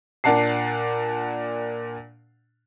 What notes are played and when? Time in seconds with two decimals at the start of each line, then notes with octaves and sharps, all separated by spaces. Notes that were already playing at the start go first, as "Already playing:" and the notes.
0.24 A#2 D4 F#5 A5 C7